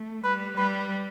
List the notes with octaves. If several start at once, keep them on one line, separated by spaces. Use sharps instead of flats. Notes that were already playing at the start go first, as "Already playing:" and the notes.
Already playing: A3
G3 B4
G3 B4